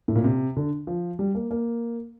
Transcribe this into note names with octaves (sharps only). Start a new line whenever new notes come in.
A2
A#2
C3
D3
F3
G3
A#3
A#3